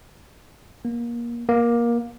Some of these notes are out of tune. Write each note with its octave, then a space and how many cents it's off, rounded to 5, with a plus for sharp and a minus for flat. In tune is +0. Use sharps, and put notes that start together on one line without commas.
A#3 +25
A#3 +20